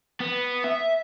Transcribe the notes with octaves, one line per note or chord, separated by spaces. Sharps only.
B3
E5